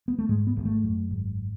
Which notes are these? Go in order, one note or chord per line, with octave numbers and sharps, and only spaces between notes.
B3
A3
G#2 G#3
B3
G#1
A3
F#2
G#1